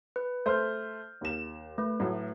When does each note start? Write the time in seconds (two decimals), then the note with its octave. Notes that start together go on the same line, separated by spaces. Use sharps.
0.16 B4
0.46 A3 C5 F6 G6
1.21 D#2 E7
1.78 A3 B4
2.00 A2 F#3